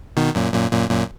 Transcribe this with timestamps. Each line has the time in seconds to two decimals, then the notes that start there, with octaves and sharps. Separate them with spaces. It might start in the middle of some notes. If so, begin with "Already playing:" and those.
0.17 B2 D#3
0.35 F#2 A#2
0.53 F#2 A#2
0.72 F#2 A#2
0.90 F#2 A#2